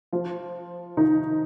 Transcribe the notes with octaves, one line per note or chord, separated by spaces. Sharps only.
F3 F4
D#3 D#4